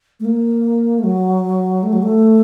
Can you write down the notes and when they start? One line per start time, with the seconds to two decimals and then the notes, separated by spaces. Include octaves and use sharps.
0.20 A3
0.25 A#3
0.99 A3
1.04 F#3
1.83 A3
1.93 F#3
2.03 A3